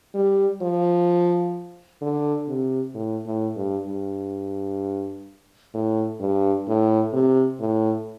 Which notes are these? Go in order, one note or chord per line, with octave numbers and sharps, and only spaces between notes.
G3
F3
D3
C3
A2
A2
G2
G2
A2
G2
A2
C3
A2